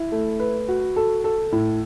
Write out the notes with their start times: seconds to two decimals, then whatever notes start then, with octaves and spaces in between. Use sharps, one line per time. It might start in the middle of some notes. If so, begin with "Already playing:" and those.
Already playing: E4
0.12 A3
0.40 B4
0.68 F#4
0.96 A4
1.24 A4
1.52 A2